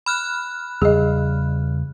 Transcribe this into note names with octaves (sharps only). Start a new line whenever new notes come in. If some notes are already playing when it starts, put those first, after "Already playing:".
B5 F6 F#6
E2 C#3 G3 G#4 D#5